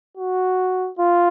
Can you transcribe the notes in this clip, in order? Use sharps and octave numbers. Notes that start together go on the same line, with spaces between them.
F#4
F4